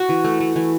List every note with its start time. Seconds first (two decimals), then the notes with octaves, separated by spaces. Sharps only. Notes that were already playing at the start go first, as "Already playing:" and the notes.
Already playing: F#4
0.09 E3
0.24 A3
0.40 A3
0.56 E3